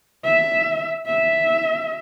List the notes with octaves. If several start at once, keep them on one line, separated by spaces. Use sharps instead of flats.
E5
E5